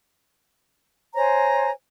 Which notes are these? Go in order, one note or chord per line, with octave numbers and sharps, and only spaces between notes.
C5 C#5 G#5 A#5